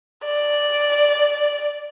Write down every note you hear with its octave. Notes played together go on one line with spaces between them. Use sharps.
D5